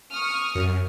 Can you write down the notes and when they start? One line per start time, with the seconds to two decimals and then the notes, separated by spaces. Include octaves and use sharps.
0.11 C#6 D#6 F6
0.55 F#2